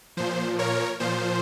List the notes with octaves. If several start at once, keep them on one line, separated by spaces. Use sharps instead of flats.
A#2 F3 C5
A#4 C#5
A#2 F3 C5